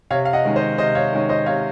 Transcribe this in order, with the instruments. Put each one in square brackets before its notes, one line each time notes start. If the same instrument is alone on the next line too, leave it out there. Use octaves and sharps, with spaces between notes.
[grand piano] C3 C#5 F5
F5
D#5 F#5
D#3 G#3 C#4
C5 D#5
C3 C5 D#5
C#5 F5
D#3 G#3 C#4
C5 D#5
C3 C#5 F5